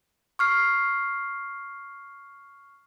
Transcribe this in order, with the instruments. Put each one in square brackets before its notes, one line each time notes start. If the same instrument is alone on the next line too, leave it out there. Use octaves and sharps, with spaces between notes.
[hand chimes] C#6 F6 C7